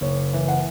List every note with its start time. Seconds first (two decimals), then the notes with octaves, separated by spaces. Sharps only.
0.01 F#1 C#5
0.33 E3
0.48 F#5